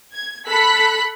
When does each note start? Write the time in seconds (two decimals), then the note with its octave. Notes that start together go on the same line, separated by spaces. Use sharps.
0.15 G#6
0.49 A4 B5 F#6 B6